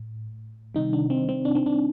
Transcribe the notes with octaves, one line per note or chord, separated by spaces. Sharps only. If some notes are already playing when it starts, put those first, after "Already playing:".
Already playing: A2
C3 D#3 G3 D#4
D4
C4
C4
D4
C4
D4